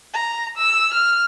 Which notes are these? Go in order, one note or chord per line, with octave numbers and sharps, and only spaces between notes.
A#5
E6
F6